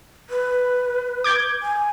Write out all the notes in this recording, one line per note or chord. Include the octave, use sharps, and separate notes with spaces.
B4
D6 G6 G#6
G#5